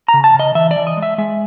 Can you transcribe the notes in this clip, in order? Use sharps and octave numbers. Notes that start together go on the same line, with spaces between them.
A#5
C#3
A5
C#3
D#5
E3 E5
D5
E3
D#5
G#3
E5
G#3 E5